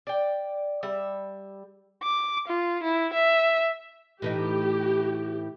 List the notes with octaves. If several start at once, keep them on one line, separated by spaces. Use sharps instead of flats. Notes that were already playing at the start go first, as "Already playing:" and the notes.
D5 G5
G3 E5
D6
F4
E4
E5
A2 E3 D#4 G4